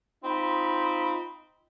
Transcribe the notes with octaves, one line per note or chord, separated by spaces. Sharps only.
C4 D#4 F4 B5